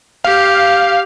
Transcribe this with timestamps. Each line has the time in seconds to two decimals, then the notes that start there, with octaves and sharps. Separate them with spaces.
0.24 G4 F5